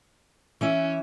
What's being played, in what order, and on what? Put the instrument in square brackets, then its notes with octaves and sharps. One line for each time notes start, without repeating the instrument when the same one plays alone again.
[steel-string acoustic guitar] E3 E4 E5 [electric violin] C#4